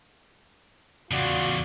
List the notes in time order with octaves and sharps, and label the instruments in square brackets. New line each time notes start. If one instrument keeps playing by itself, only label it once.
[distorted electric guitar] E2 C#3 [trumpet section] F4 F#4 D5